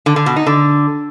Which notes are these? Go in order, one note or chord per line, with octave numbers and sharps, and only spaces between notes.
D3
D3
B2
D#4
D3